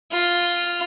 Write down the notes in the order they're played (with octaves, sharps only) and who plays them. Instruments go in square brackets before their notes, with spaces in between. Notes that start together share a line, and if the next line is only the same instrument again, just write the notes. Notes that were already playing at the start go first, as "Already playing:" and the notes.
[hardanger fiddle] F4